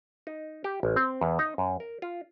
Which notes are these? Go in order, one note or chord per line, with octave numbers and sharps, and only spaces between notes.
D#4
G4
A1
C4
E2
D#4
F#2
A#4
F4